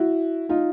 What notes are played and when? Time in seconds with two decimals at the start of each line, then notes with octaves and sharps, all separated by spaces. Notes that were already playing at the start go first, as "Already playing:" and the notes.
Already playing: E4 F#4
0.49 D#4 F4